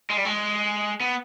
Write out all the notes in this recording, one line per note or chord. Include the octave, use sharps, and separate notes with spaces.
G#3
G3
G#3
B3